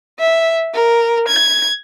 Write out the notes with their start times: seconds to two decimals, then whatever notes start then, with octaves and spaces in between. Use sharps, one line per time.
0.19 E5
0.74 A#4
1.28 G#6